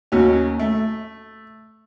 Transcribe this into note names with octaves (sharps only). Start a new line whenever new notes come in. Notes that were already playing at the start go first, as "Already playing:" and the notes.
D#2 F#3 C#4
A3